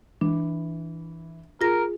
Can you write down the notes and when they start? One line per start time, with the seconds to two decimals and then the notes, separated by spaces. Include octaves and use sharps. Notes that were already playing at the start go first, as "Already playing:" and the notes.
0.21 E3 D4
1.61 F4 G#4 A#4 A#6